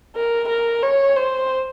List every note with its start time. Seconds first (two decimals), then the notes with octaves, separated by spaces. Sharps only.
0.16 A#4
0.49 A#4
0.83 C#5
1.16 C5